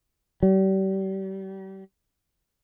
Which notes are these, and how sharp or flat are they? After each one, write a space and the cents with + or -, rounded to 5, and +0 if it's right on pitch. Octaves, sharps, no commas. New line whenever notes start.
G3 -35